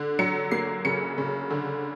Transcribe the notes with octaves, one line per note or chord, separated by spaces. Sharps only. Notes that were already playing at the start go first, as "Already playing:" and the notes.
Already playing: D3
F#3 C#7
A#3 C7
C#3 C#7
C#3
D3